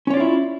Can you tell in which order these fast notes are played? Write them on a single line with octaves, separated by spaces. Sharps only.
C#4 C#5 D5 F4 E4